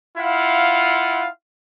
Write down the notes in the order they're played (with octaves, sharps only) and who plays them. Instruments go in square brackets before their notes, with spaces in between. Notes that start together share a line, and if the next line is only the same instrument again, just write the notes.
[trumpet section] E4 F4 F5 F#5